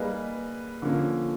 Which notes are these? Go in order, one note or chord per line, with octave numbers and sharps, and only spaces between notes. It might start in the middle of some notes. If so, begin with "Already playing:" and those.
Already playing: G3 A#3 D#4 G#4 B4
D3 F3 A#3 C#4